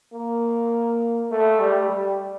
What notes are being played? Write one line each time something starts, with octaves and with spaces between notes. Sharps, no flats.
A#3
A3
G3
G3